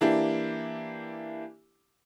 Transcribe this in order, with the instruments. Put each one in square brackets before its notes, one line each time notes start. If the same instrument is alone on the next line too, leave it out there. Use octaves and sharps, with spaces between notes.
[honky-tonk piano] E3 A#3 D4 E4 G4